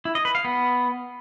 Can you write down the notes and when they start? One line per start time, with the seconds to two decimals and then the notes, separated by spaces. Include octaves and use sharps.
0.05 E4
0.15 D#5
0.25 B4
0.35 F5
0.45 B3